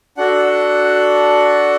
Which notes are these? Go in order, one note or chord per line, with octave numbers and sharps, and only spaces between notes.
D4 F#4 A4 F#5